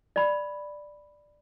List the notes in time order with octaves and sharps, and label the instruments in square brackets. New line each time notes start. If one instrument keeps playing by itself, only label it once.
[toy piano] D5 B5